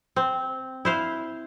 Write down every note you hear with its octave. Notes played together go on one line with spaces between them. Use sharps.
C4
E4 C5 F5